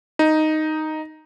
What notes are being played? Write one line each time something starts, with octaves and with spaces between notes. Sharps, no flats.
D#4